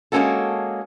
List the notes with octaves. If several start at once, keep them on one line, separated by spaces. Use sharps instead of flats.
G#3 A#3 C4 C#4 F#4 A4